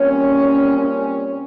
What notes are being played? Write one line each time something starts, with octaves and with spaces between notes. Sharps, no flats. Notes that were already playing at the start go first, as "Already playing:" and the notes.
Already playing: A#2 G3 C4 C#4
C#4